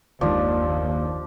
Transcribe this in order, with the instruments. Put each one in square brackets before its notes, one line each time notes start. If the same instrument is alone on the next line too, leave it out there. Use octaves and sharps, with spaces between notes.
[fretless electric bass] F#1 D#3 G#3 [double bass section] D#2 [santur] F3 D4